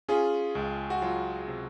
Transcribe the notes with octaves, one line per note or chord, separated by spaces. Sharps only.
C#4 F4 G#4
C#2
F#4
F#3 F4
C3